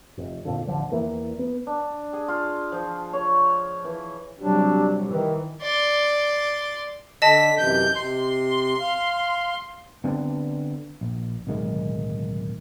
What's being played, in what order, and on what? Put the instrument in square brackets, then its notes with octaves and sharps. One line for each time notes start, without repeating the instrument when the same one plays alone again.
[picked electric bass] F1
E1 F2 A#2 D3
D1 A1 D3 F3
E2 E3 A#3
B3
[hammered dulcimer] D4
G#4
F4
F3
C#5
E3
[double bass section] C3 F#3 G3 [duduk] D4
[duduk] D#3 [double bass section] E3
[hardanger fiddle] D5 C6
[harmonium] D3 [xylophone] D#5 A5 [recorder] B6
[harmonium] F#2 C3 E3 [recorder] G6
[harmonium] C3 [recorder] C6
[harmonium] F5
[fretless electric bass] D3 B3 C4 D4
A#1
D1 B1 D#3 G#3